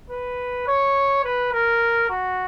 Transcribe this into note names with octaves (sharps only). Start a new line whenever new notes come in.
B4
C#5
B4
A#4
F#4